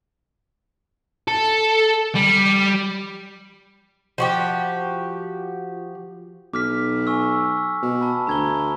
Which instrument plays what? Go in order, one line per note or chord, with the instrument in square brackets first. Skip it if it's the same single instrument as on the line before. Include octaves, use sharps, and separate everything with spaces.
[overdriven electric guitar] A4
G3
[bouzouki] F3 F#4 G4
[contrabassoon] B1 [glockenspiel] D6 F6 B6
[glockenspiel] G#5 C#6 E6
[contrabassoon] B2
[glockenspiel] A5 B5
[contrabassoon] D2 [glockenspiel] A#5 G#6 G7